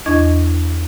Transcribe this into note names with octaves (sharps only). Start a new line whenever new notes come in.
E2 D4 D#5 C#6 G#6